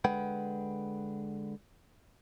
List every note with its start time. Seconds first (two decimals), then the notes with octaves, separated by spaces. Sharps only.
0.05 D3 G#3 B4 F#5 G5